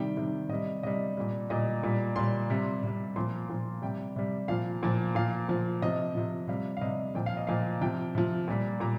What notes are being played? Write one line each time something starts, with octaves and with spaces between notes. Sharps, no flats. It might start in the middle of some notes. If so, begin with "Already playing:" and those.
Already playing: C3 D#3 G3 G5
C3 D#3 G3
C3 G3 D#5
C3 G3 D#5
A#2 G3
A#2 G3 D#5
A#2 G3
A#2 G3 C6
C3 G3
C3 G3
A#2 F3 C6
A#2 F3
C3 G3 G5
C3 G3
A#2 F3 F5
A#2 F3
A#2 F3 F5
A#2 F3
C3 F3 D#5
C3 F3
C3 G3 F5
F5
C3 G3 D#5
A#2 F3 G5
F5
D#5
A#2 F3 F5
C3 F3 G5
C3 F3
A#2 G3
A#2 G3 A#5